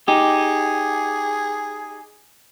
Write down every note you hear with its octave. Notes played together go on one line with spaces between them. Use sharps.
D#4 G4 G#4